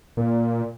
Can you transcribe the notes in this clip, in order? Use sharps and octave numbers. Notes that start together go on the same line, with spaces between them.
A#2